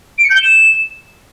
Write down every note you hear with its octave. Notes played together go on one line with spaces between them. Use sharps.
D7
C#7
G6
G7
E7